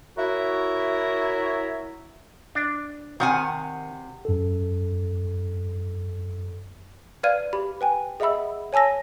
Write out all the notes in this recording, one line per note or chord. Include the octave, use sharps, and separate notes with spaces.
E4 F#4 A#4 C#5 E5
D4
C3 D#3 F#5 G#5
F#2 A4
B4 D5 F5 F6 G#6 D#7
G4 B5
B4 G5 G#5
G#4 D#5 E5 F#5 B5 E6
C#5 G#5 A5 E6 A#6